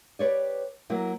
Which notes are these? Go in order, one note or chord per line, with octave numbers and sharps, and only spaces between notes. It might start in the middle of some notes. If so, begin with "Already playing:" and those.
G4 B4 C#5 D5
F#3 A#3 E4